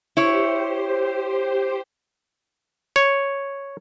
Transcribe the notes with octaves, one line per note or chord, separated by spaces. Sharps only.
E4 G4 C5 C#5
C#5